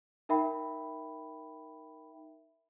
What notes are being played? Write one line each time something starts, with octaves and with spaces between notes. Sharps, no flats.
D#4 A#4 E5 G5 B5